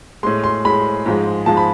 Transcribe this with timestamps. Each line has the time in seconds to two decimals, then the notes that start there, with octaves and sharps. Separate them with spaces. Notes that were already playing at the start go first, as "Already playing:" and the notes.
0.23 A2 G#3 C6
0.44 C6
0.65 A2 G#3 B5
1.06 G#2 F3 G#3
1.46 G#2 F3 G#3 A5
1.57 B5